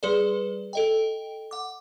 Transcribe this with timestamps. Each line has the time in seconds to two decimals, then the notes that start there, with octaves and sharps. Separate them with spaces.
0.03 G3 G#4 B4 D5
0.73 A4 D#5 G5
1.51 F#5 D6